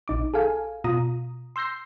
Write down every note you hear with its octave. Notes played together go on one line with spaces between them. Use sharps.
A#1 D#4 D6
G#4 A4 F5 G#5
B2 F4 A#5 D#6
C6 E6 G6 A#6 C7